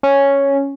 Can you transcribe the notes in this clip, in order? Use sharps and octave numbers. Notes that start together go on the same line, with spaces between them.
C#4